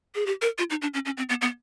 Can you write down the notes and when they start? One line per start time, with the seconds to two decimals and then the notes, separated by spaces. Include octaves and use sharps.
0.15 G#4
0.26 G4
0.42 A#4
0.58 F4
0.70 D#4
0.82 D4
0.94 C#4
1.06 C#4
1.17 C4
1.29 B3
1.42 B3